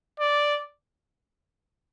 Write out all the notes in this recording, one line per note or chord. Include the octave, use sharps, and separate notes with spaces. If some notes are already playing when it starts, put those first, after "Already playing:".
D5